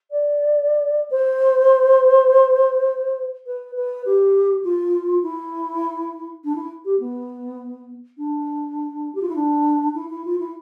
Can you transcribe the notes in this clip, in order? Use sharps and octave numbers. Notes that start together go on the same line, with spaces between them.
D5
C5
B4
B4
G4
F4
E4
D4
E4
G4
B3
D4
G4
F4
E4
D4
E4
E4
F4
E4